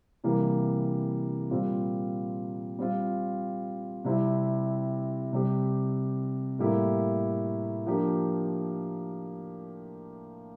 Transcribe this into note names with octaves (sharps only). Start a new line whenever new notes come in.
C3 E3 G3 A#3
A#2 G3 C4 F4
G3 C4 F4
C3 G3 C4 E4
C3 G3 C4 G4
A2 G3 A#3 E4 G4
F3 A#3 D4 G4